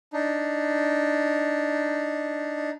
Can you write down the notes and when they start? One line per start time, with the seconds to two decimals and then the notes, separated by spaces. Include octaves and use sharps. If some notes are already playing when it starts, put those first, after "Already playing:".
0.13 D4 D#4